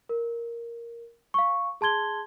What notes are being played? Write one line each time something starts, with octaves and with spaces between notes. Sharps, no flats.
A#4
F5 C#6
G#4 A5 C6 G#6 G7